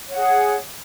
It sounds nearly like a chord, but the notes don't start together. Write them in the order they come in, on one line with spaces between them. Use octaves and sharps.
C#5 F#5 G#4